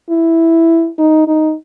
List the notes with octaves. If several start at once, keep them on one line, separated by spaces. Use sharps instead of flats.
E4
D#4
D#4